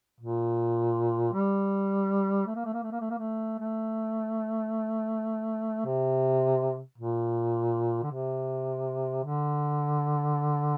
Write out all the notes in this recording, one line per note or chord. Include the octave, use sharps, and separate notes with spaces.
A#2
G3
A3
A#3
A3
A#3
A3
A#3
A3
A#3
A3
A3
C3
A#2
D3
C3
D3